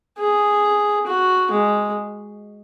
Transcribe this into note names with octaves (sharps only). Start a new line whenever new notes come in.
G#4
F#4
G#3